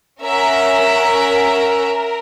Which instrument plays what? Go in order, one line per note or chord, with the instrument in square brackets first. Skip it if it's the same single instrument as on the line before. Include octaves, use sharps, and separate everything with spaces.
[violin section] C#4 E5 F#5 [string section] A#4